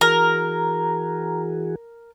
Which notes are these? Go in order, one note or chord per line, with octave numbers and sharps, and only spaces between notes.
E3 F#4 G#4 A#4 A#5